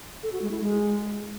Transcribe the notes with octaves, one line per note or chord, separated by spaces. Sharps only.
A4
F#4
G#3
E4
G#3